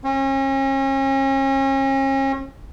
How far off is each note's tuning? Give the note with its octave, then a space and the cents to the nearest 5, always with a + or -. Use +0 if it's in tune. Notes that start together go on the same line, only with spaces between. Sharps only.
C#4 -40